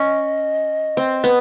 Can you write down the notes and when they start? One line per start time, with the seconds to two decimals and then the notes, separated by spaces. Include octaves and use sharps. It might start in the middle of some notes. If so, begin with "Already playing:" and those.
Already playing: C#4 D#5
0.97 C4
1.24 B3